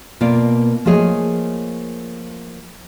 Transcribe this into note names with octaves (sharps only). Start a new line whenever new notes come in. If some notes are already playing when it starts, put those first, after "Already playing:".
B2 A#3 F4 D5
F3 A3 A#3 G#4 C#5 D#5